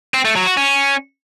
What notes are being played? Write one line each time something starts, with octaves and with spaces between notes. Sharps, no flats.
C4
A3
F#3
F#4
C#4